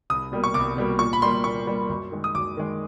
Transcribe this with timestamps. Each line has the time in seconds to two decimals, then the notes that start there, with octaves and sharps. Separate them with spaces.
0.10 C2 D#6
0.32 B2 G3 A#3
0.44 C#6
0.54 C2 D6
0.77 B2 G3 A#3
0.99 A#2 C#6
1.13 B5
1.22 G3 A#3 C6
1.44 A#2 C#6
1.67 G3 A#3
1.89 F#2
2.12 D#3 G#3
2.24 D#6
2.35 F#2 D6
2.57 D#3 G#3